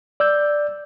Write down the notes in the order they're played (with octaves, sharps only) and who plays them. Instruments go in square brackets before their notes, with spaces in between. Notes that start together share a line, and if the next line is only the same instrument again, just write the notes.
[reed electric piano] D5 E6 G6